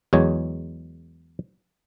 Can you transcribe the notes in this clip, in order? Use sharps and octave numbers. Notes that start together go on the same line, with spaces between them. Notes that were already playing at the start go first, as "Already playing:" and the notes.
E2 F#3 G#3 C#5